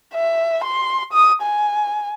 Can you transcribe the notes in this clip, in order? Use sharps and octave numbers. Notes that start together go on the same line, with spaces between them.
E5
C6
D#6
G#5